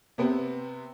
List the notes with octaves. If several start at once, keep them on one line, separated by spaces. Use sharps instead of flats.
C3 B3 C4